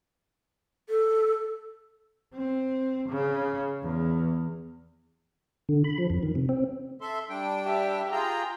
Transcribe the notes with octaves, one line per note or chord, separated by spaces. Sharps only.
A4
C4
C#3
E2
D3
B5
F3
F2
D#3
C3
C4
A4 E5 C6
G3 D4 G5
G4 E5
F4 G#4 G5 A#5